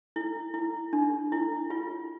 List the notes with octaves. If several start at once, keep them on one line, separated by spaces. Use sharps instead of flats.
E4
E4
D4
E4
F4